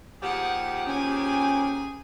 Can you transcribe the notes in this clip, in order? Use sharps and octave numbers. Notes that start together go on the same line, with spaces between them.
D#2 F3 G4 G#4 F#5
C#4 G#4 G#5